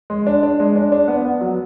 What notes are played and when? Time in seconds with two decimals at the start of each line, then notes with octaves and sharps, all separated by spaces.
0.10 G#3
0.27 D4
0.43 D4
0.60 G#3
0.76 D4
0.92 D4
1.08 B3
1.25 B3
1.41 F#3